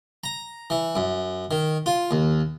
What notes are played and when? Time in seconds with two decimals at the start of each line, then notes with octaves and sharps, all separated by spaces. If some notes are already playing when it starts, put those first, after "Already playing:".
0.24 A#5
0.70 E3
0.96 F#2
1.51 D#3
1.86 F4
2.11 D#2